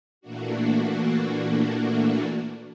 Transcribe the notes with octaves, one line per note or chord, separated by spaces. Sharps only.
A#2 E3 A3 A#3 D4 F#4